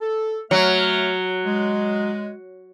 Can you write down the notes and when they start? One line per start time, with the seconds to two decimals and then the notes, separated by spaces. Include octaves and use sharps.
0.01 A4
0.51 F#3 A3 E5 F6
1.46 G#3